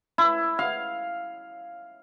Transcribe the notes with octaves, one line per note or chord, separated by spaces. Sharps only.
E4
F5